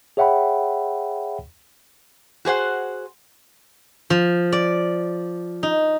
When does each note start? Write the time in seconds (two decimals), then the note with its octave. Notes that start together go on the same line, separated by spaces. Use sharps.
0.17 G#4 C#5 E5 F#5 G5 B5
2.45 F#4 G#4 C5 F#5
4.10 F3
4.52 D5
5.63 D#4